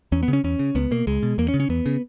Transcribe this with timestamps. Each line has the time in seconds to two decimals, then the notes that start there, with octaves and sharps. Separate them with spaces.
0.12 E2 C#4
0.23 B3
0.28 C#3
0.33 C#4
0.44 E2 C#4
0.59 C#3
0.75 C#2 B3
0.91 B2 A#3
1.07 C#2 G#3
1.23 B2
1.38 E2 A#3
1.48 C#4
1.54 C#3
1.60 C#4
1.69 E2 B3
1.86 C#3